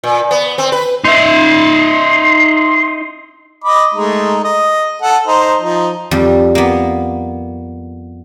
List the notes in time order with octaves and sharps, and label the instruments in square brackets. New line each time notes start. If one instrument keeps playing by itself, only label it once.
[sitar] A#2
B3
C4
B4
[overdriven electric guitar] D#4 E5 [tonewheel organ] C6
[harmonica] D#5 B5 D6
G#3 A3 D#4
D#5
A4 F#5
D#4 C5
F3 D#4
[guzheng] F2 G3
A#3 B3